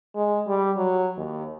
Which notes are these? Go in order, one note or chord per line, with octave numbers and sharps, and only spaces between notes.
G#3
G3
F#3
D#2